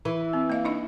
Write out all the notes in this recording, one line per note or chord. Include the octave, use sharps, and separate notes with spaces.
E3
C4
A#3 D#5 F5
D4 D#4 D#5